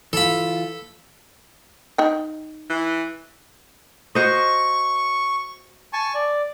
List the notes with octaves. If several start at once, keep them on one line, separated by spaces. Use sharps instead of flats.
E3 F4 A4 B5
D#4 G5
E3
F#4 C5 D#5 C#6
G#5 A5 C#6
D5